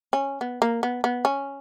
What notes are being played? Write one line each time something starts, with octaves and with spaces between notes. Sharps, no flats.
C#4
B3
A#3
B3
B3
C#4